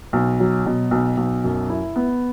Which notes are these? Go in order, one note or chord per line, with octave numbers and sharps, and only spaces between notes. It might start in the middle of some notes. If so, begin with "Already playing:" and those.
B1
F#3
B2
B1
B1
F#2
E4
B3